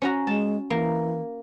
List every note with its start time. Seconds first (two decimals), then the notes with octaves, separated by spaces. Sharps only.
0.02 C#4 F#4 A#5
0.27 G#3 A5
0.70 E3 A#3